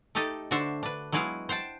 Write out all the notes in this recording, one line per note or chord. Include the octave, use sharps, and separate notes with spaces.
A3 D#4 G4 A4 D#5
D3 D4 F#4 C5 E5
D4 B4
F#3 G#3 B3 E4 B4 F5
C5 F#5 G5 A5